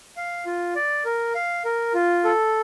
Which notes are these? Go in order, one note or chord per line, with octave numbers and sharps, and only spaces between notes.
F5
F4
D5
A#4
F5
A#4
F4
A4